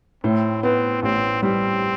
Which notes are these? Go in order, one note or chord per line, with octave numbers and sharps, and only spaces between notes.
A2 C4
B3 C4
A1 C4
G3 C4